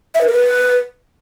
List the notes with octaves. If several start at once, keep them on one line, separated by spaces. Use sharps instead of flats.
E5
B4
A#4
B4